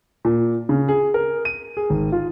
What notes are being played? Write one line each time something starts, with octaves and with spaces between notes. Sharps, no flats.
A#2
C#3
G#4
A#4
D#7
G#4
G#1
F4